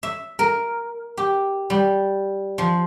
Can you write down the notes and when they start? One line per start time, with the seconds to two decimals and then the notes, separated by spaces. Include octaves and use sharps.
0.03 E5
0.39 A#4
1.17 G4
1.70 G3
2.58 F3